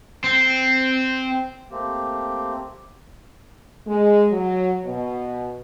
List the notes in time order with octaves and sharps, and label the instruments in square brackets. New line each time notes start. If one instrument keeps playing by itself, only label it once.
[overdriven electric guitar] C4
[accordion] A3 A#3 C4 G4
[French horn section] G#3
F#3
B2